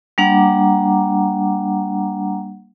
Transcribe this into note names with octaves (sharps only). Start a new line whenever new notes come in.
G3 A#3 D4 F#5 A#5 D6